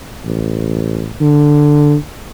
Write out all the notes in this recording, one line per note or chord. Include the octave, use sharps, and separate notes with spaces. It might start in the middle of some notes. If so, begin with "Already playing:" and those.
A1
D3